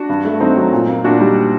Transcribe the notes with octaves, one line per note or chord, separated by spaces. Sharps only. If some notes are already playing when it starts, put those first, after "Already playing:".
Already playing: D4 F#4
G2
A3
G2 C4 D#4
F#3
A#2
A#3
A#2 D4 F#4
G3 D#4 G4